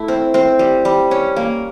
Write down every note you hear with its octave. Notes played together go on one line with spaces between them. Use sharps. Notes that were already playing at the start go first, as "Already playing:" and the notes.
Already playing: A3 E4
C4
C4
G3
G3
C#4
A#3